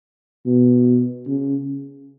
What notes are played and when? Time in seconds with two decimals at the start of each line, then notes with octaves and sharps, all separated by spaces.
0.46 B2
1.27 C#3